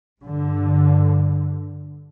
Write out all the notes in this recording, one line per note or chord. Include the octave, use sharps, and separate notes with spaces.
G2 D3